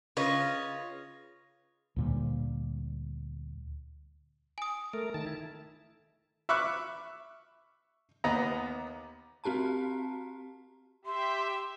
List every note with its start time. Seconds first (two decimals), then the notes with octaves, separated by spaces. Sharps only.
0.17 C#3 F4 B4 C#5 D#5
1.96 D2 A#2 G3
4.58 G#5 D#6
4.93 A3 A#4
5.14 D#3 A5
5.26 E4
6.49 E5 B5 C#6 D6 F6 F#6
8.24 D#2 B3 D#5 A#5
9.44 C4 F#4 G4 A5 A#5
11.05 G4 E5 C6